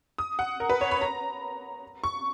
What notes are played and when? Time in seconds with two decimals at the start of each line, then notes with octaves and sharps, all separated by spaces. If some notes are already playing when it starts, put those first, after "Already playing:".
0.18 D#6
0.39 F#5
0.60 A#4
0.70 B4
0.81 C#5
0.91 B5
1.01 A#5
2.04 C#6